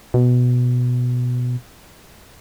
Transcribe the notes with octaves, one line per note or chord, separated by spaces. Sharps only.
B2